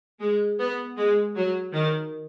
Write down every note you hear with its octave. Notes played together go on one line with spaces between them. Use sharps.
G#3
B3
G#3
F#3
D#3